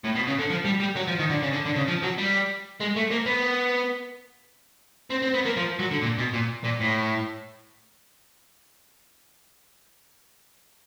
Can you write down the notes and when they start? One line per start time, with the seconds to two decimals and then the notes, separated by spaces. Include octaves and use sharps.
0.04 A2
0.15 B2
0.27 C#3
0.39 D3
0.50 F3
0.65 G3
0.80 G3
0.96 F#3
1.08 F3
1.19 D#3
1.30 D3
1.42 C#3
1.53 D3
1.65 D3
1.76 C#3
1.88 F3
2.03 F#3
2.18 G3
2.80 G#3
2.96 A3
3.11 A#3
3.26 B3
5.10 C4
5.22 C4
5.34 B3
5.45 A#3
5.57 F3
5.79 F#3
5.91 D3
6.02 A#2
6.18 B2
6.34 A#2
6.64 A#2
6.80 A2